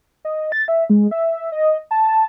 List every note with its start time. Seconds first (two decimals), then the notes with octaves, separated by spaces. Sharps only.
0.25 D#5
0.52 A6
0.68 E5
0.90 G#3
1.11 E5
1.52 D#5
1.91 A5